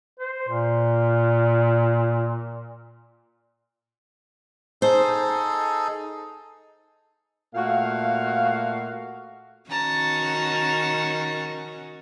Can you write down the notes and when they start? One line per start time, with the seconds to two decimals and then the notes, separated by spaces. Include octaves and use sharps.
0.20 C5
0.49 A#2
4.82 D#4 G#4 A4 C5
7.55 A#2 A3 F#4 F5
9.70 D#3 C#4 F#4 A5 A#5